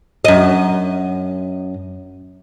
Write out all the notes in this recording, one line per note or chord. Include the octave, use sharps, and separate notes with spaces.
F#2 D#5